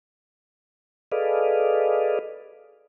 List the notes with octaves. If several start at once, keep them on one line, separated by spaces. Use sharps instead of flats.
G#4 A4 B4 D5 D#5 F5